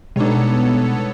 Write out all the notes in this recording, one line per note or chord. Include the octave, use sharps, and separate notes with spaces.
B2 G3 G#3 B3 D4 D#4 A4 C#5